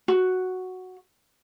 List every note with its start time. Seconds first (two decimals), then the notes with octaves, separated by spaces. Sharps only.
0.08 F#4